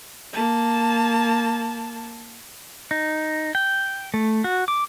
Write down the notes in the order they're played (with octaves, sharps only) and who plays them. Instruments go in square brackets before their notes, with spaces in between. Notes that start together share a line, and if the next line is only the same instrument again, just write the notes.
[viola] A#3 A5
[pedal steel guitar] D#4
G5
A3
F#4
D6